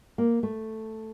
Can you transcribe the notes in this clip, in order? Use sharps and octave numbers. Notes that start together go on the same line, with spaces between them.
A#3
A3